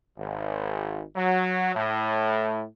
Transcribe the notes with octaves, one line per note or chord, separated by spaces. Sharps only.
G#1
F#3
A2